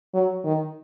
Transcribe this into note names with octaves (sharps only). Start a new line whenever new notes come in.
F#3
D#3